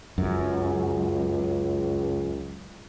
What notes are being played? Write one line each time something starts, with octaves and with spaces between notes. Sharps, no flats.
C#2 F#2